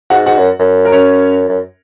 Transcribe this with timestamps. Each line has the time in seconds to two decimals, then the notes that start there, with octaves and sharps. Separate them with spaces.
0.10 G#2 F#4 F#5
0.26 G#2 F#4 F#5
0.38 F#2
0.59 F#2
0.85 A#4
0.92 C#4 C#5
1.49 F#2